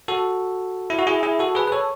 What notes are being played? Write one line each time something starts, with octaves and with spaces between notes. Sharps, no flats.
F#4 A4
E4
F#4
E4 G#4
E4 G#4
F#4 A4
G#4 B4
B4
A4 C#5